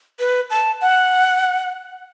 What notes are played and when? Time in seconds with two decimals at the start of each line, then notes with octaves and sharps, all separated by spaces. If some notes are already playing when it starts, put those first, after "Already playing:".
0.19 B4
0.50 A5
0.81 F#5